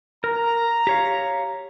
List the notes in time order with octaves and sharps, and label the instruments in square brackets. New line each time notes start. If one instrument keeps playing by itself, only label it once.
[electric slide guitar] A#4 [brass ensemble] A#5
[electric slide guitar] G4 C#5 F5